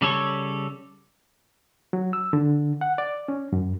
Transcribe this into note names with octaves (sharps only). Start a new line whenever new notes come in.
C#3 G3 A4 C#5
F#3
E6
D3
F#5
D5
C#4
F#2